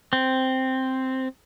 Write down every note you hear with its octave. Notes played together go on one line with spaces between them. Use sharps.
C4